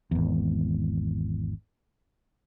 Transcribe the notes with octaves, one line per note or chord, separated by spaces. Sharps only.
G#1 E2